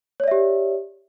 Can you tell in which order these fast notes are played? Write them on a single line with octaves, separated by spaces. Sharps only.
C#5 D5 E5 G4